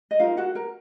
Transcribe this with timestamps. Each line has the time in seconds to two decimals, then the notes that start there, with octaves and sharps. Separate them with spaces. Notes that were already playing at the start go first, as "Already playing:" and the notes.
0.11 D#5
0.20 D#4 F4 A#4 F5
0.37 F#4 F#5
0.55 A#4 A#5